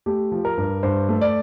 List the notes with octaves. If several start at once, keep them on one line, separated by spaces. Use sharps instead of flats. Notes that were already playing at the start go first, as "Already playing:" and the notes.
A3 G4
F3
A#4
G2
G2 C5
A3
D5